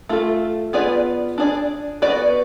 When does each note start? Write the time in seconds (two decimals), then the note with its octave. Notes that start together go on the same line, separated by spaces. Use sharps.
0.09 A3 F4 A4
0.73 B3 F4 G#4 B4 D5
1.38 D4 G#4 D5
2.02 B3 F#4 B4 D5